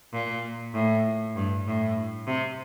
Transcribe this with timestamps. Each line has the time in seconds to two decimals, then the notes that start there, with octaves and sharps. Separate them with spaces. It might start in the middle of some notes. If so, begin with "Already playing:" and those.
0.13 A#2
0.74 A2
1.36 G2
1.66 A2
2.27 C3